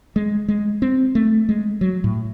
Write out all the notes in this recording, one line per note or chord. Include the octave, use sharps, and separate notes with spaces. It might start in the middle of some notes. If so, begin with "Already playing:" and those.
G#3
G#3
C4
A3
G#3
F#3
A2